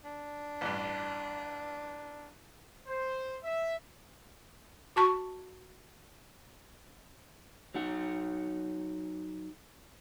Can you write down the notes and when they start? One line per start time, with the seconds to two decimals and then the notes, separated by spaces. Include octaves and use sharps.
0.05 D4
0.61 A1 G2
2.88 C5
3.43 E5
4.96 F#4 A5 C#6
7.74 F#3 D#4 F#5